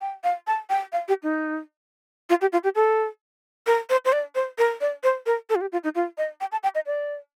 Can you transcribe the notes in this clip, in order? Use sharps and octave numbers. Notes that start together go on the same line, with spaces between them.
G5
F5
A5
G5
F5
G4
D#4
F4
G4
F4
G4
A4
A#4
C5
C5
D5
C5
A#4
D5
C5
A#4
A4
F4
G4
F4
D#4
F4
D#5
G5
A5
G5
D#5
D5